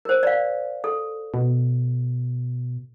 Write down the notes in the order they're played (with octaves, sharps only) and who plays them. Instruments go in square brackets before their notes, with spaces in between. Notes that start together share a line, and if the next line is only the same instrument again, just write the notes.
[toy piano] A#4 C5
D5 F5
A4
[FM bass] B2